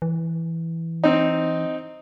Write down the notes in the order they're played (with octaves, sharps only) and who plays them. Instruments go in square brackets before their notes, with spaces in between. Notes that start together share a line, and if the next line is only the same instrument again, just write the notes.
[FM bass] E3
[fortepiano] C4 D#4